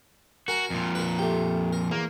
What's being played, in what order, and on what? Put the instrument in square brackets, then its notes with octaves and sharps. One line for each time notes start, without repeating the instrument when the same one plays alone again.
[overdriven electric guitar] F#4 [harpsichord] A#4 G#5 A#5
[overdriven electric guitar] F2 A#2
[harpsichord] A#4 B4
A3 G4
A#4
[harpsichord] E2 [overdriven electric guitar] A#3